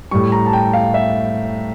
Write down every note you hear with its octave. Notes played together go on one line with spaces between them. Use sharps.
A2 G3 C#6
A#5
A5
G5
F5
E5